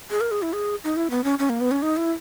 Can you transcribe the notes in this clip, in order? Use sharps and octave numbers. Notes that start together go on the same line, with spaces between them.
G#4
A#4
G#4
E4
G#4
D#4
E4
B3
C#4
C#4
A#3
B3
C#4
D#4
E4